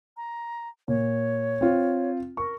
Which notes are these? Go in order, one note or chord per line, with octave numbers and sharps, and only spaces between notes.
A#5
A#2 C#5
C4 F4
A#4 C#6